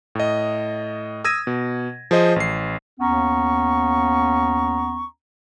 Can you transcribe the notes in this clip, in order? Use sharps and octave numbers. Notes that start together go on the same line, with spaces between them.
A2 D#5
D#6 E6 G#6 A#6 D#7
B2
F3 G#4 C5 D#5
A1 C7
D#2 B3 C#4 A#5 C#6